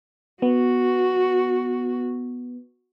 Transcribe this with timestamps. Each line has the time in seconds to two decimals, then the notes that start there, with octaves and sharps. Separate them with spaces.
0.42 B3 F#4